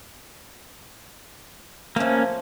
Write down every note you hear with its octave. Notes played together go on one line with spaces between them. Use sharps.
F3 A3 A#3 C#4